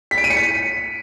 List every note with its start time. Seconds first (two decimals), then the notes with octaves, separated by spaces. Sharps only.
0.11 B6
0.18 D7
0.24 D#7
0.30 C#7
0.37 B6